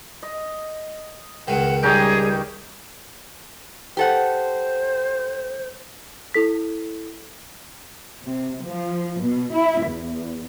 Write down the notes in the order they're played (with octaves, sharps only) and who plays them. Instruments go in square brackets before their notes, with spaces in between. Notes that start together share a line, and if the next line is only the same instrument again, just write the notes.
[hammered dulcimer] D#5
[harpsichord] C#2 D#3 [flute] F#5
[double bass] G3 [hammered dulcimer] C#4 D#4 G5 [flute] G#4
[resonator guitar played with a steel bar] G4 A4 F#5 [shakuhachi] C5
[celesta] E4 A4 B6
[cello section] C3
F3
B2
E4
E2